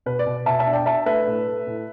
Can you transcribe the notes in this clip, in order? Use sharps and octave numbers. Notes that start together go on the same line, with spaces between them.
B2 B4
D5
B2
B2 E5 A5
E5 A5
D4
D5 G5
D4 E5 A5
A3 B4 E5
A2
A3
A2